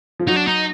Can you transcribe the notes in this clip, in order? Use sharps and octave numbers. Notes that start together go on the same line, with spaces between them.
F3
F#3 D#4
D4
D#4